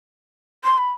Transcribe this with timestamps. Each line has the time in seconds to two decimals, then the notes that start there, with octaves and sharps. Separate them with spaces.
0.64 C6
0.78 B5